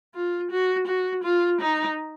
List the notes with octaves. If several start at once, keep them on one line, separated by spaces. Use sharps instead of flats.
F4
F#4
F#4
F4
D#4